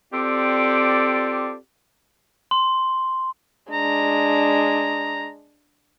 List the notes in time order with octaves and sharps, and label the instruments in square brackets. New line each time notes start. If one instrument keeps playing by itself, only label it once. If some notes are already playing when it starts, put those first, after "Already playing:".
[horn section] C4 F4 G4 A4 D5
[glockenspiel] C6
[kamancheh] G#3 D4 [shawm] A#5